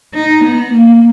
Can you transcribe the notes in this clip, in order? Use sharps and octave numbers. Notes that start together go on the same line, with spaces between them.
D#4
B3
A#3